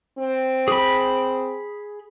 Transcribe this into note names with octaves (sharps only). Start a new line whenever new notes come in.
C4
G#4 B5